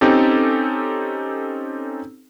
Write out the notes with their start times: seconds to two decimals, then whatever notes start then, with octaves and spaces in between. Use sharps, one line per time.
0.01 C4 C#4 D#4 G4 A4